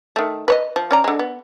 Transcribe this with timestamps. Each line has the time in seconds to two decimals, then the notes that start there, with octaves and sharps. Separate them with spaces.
0.16 D#3 A3
0.48 B4 C#5 D#5
0.76 F3
0.91 C#4 D5 A#5
1.04 D3 G#3
1.19 B3